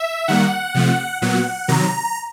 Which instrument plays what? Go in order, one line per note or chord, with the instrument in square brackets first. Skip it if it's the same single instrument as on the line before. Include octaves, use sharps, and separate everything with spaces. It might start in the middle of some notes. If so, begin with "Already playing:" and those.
Already playing: [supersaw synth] E5
D#3 G3 A#3 F#5
C3 F3 A3
A#2 F#3 B3 F#5
C3 D#3 F#3 A#5